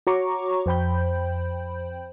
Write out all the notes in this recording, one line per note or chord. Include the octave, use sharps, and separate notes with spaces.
F#4 C#5 A#5 C#6 D6
F2 C5 G5 B5 G6